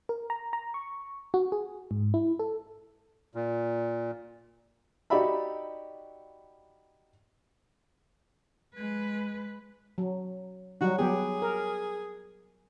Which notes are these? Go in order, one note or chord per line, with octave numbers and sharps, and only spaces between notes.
A#4
A#5
A#5
C#6
F#4
G#4
G#2
E4
A4
A#2
D#4 F#4 G4 D5 E5 B5
G#3 B4
F#3
F#3 G3 D#4 F#4
F#3 B3 G4 G#4
A#4